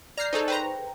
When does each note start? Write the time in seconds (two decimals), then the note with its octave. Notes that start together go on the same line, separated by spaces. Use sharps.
0.18 D5 A#5 F6 G6 C7
0.33 D#4 G#4 A4 C5 C#6
0.48 B4 C5 G5 A#5